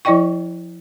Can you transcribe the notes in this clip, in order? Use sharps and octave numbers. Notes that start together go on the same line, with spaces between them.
F3 E4 D5 D#5 G5 C#6